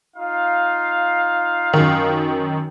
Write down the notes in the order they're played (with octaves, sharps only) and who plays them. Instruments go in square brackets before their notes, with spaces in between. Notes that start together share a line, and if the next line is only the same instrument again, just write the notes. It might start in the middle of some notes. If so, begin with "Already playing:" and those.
[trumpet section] D#4 F4 F5
[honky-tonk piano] F#2 D#3